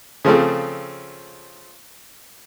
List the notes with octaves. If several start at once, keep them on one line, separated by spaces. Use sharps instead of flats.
C#3 F3 A3 C4